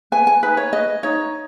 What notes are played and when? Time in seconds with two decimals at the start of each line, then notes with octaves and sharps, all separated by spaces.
0.12 B4 G#5
0.27 G#5
0.43 D#4 B4
0.57 C#5
0.73 B4 D#5
1.03 D#4 C#5